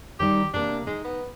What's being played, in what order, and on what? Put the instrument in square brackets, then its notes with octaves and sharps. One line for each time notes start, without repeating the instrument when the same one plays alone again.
[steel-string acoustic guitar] D#3 G3 D#4 [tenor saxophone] G4
[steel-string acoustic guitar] C3 A#3 [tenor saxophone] D4
[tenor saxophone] G#3 [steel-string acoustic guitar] D#4
[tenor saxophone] B3